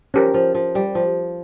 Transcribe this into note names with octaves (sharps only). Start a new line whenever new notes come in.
F3 C#4 G4 A#4
F3
F3
G3
F3